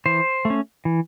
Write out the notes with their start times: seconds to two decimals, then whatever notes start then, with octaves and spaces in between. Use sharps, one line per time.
0.06 E3 C5
0.45 A3
0.50 C#4
0.85 E3